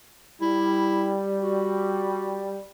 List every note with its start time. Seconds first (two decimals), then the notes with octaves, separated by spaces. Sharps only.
0.42 G3 E4
1.42 F#4